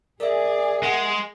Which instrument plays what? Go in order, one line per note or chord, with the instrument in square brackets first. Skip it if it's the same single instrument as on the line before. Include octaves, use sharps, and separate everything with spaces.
[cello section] G#4 [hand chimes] A#4 E5 [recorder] D5
[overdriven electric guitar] G#3 [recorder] F#5